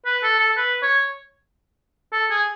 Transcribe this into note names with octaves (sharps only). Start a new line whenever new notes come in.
B4
A4
A4
B4
C#5
A4
G#4